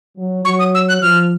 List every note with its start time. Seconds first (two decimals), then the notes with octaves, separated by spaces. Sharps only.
0.17 F#3
0.45 F#3 C#6
0.59 D#6
0.75 E6
0.89 F#6
1.02 F3 F6